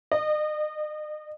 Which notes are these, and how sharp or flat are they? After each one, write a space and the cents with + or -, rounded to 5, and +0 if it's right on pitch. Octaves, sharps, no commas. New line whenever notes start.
D#5 -40